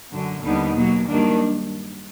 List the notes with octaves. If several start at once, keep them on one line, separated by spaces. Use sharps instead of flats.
F#2 D3 F#3
D#2 D3 G3 B3 D#4
B2 F#3 A#3
G2 D#3 F#3 A#3 D4